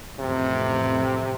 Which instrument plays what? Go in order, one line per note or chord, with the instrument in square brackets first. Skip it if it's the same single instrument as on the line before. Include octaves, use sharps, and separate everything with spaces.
[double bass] A1 F2 [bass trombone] C3